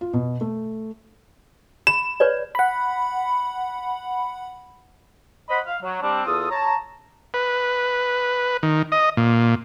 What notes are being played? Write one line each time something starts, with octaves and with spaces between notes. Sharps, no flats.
F4
B2
A3
B5 E7
B4 C#5 D5
F#5 B5
C5 D#5 F#5 B5
F5
F#3
G3 C4 D4
E2 F4 A4 D#6
C#5 A5 A#5
B4
D#3
D#5
A#2